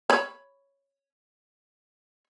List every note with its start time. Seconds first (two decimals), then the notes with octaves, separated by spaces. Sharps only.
0.10 C#5 B5